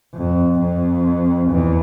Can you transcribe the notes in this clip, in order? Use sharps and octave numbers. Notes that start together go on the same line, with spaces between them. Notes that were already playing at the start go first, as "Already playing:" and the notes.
F2
F2
E2